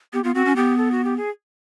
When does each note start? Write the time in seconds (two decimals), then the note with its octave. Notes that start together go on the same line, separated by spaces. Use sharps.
0.13 B3 G4
0.24 B3 F4
0.34 C4 F#4
0.45 C#4
0.56 B3 G4
0.78 A4
0.91 F#4
1.04 G4
1.17 G#4